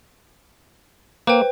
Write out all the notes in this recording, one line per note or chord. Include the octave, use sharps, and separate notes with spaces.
A#3 B4 C5 G5